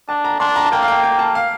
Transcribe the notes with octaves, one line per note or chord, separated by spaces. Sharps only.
D4 A5
A#5
D4 C6
A#5
A5
A#3 G5
F5
G5
G5
A5
F5